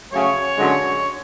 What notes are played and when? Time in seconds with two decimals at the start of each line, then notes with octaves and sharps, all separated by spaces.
0.12 C#3 F#3 A3 C#5
0.58 F#2 D3 G#3